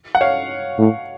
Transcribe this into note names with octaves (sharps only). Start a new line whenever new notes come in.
F#5
C#5 F5
A2